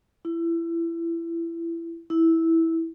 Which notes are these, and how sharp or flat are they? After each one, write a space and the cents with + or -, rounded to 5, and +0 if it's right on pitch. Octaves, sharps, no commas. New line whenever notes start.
E4 +25
E4 -10